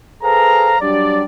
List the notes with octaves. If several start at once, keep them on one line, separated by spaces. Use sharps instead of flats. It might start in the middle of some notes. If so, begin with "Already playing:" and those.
G#4 A4 B4 C5 F5 A#5
F#3 G3 D4 G4 D5